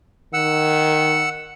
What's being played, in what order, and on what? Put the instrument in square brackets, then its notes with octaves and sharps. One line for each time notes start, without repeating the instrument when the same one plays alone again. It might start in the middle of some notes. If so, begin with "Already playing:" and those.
[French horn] D#3 [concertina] F#5 E6